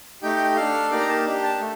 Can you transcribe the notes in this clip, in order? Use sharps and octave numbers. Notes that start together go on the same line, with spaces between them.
A3 D#4 G4 G5
D4 A4 F5
A#3 D#4 G4 D5
A#5
A5
D4 G4
A5
A3